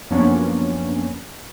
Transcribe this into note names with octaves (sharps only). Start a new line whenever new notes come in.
F#2 F3 A#3 B3 C#4 D4